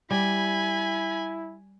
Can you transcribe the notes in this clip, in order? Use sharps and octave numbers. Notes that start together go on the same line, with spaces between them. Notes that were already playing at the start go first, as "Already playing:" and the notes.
G3 E4 G#5 B5